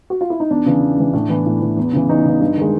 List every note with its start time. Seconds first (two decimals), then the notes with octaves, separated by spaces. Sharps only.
0.10 F#4
0.21 F4
0.30 E4
0.40 D#4
0.50 E2 D4
0.66 C#3 E3
0.82 E2
0.98 C#3 E3
1.13 A2 D4
1.29 E3 B3
1.46 A2
1.62 E3
1.77 E2
1.93 C#3 E3
2.09 E2 D#4
2.25 C#3 E3
2.40 G2
2.57 D#3 G#3